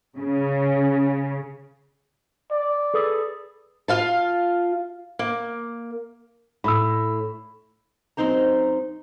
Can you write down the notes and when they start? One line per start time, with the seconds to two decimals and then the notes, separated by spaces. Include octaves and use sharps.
0.18 C#3
2.51 D5
2.94 G#4 A4 B4
3.88 F4 F5 A5
5.19 A#3
6.64 A2 B5 E6
8.17 F#2 C#3 C4 D#4 C5 A#5